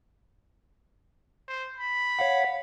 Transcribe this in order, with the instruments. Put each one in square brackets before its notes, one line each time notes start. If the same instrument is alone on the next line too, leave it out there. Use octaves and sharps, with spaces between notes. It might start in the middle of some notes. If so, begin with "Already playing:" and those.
[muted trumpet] C5
B5
[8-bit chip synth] C#5 F5 F#5